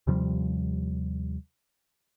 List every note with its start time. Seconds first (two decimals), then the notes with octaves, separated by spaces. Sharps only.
0.07 D#2 C3 F3 G3